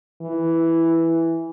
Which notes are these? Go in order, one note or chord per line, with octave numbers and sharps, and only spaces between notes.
E3